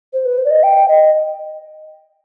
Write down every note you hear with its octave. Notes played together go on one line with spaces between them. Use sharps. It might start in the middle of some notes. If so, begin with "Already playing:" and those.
C5
B4
C5
D5
D#5
G5
D#5